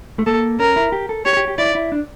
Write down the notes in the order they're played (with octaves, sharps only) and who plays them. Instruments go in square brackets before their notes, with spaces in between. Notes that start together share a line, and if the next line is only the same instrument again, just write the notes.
[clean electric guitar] A3
[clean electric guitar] A#3 [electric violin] A4
[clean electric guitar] C#4 [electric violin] A#4
[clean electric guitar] E4
G4
A4
[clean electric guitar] G4 [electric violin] C#5
[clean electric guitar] G4
G4
[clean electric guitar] E4 [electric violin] D5
[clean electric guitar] E4
D4